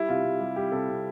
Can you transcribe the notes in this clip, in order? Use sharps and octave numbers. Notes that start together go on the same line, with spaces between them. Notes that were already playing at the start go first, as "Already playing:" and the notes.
Already playing: G3 E4
C3 F4
C3
G3
G3 G4
C3 A4
C3